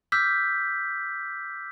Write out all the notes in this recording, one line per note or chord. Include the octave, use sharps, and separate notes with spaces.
D6 E6 F6 G6 B6